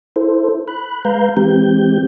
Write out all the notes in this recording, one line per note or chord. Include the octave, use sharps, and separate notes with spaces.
E4 A4 C5
B5 F#6
G#3 B4 F5 A#5 G6
E3 G#3 C4 G4 G6